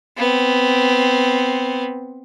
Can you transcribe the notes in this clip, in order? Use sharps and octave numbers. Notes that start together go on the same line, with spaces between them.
B3 C4